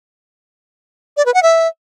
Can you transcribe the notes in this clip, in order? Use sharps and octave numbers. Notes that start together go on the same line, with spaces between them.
D5
B4
F#5
E5